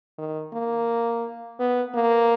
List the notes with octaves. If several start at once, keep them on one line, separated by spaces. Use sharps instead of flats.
D#3
A#3
B3
A#3